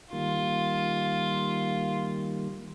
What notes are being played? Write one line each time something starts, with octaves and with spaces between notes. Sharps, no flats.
D#3 G3 A#3 F4